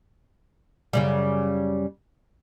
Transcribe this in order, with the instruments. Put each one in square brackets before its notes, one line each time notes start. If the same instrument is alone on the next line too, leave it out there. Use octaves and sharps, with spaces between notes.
[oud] F#2 C#3 G3